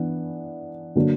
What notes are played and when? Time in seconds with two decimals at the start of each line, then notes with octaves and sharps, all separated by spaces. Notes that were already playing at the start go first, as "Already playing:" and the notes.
Already playing: E3 B3 D4
0.95 D3 F#3 A#3 D4